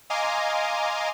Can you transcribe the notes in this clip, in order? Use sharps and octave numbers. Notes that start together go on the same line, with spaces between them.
D#5 F5 G#5 A#5 C6 D6